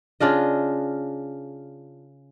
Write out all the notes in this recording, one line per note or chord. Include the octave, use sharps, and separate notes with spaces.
C#3 D4 F4 D#5